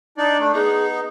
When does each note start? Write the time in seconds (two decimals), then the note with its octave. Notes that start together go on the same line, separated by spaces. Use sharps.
0.17 D4 D#4 D5
0.40 A3 D4
0.54 B3 D#4 G#4